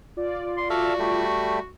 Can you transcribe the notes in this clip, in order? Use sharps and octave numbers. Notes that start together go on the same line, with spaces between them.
F4 D5
C6
F#4 A4 E5 F5
G3 A3